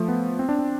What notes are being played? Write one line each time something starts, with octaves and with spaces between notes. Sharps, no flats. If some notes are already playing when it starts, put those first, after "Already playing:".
Already playing: F3 A3
B3
C4
D4
C4